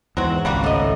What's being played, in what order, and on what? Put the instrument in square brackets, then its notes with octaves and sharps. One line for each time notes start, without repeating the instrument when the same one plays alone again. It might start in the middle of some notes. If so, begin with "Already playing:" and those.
[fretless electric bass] E2 G#2 [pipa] F#3 C4 F#4
[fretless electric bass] G#1 C#2 [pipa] G3 A#3 F#4
[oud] A2 D#5